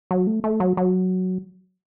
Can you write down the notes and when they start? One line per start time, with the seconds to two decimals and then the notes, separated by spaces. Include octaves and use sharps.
0.11 F#3
0.27 A3
0.44 A3
0.60 F#3
0.77 F#3